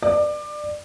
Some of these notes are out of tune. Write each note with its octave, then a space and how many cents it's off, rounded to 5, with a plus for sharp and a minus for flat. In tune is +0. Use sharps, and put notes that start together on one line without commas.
D5 +25